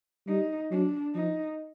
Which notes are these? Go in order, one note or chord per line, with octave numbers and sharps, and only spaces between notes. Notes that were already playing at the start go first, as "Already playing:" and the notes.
G3 D#4
F#3 D4
F3 D#4